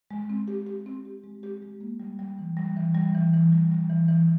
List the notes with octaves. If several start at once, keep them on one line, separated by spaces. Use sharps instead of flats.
G#3
C4
G4
G4
C4
G4
G#3
G4
G#3
A#3
G3
G3
E3
G3
E3
G3
E3
E3
G3
G3
E3
E3